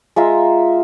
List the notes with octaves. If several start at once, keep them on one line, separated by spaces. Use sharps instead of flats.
G#3 F4 E5 A#5